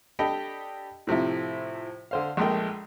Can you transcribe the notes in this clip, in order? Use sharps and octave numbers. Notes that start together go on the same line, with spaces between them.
D4 G4 A4 D#5 G5 B5
A2 C3 F3 E4
D3 C5 F5
A#1 G#3 A3 A#4 G5